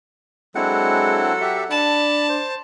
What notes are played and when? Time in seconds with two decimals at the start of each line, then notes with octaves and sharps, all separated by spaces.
0.55 F#3 G#3 C4 D4 E4 A4 F#5
1.41 G4 E5
1.71 D4 A5 B5
2.29 C5